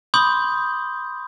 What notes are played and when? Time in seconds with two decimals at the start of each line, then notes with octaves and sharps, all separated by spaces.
0.14 B5 C6 D6 D#6 G6